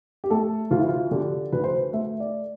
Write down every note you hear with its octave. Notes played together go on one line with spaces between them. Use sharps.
G4
A3 A4
D2 F4
E4
F4
D3 G4
D2 B4
C5
B4
A3 E5
D5